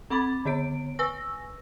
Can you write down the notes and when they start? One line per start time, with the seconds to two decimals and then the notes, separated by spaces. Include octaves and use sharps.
0.10 C4 F#5 B5 D6 A6
0.45 D3 B3 C#5 D7
0.99 B4 G#5 C#6 E6 A#6